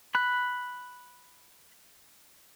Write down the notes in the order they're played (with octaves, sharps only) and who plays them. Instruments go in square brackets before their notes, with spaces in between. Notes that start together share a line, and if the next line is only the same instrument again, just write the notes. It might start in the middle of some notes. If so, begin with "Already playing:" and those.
[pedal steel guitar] B5 F#6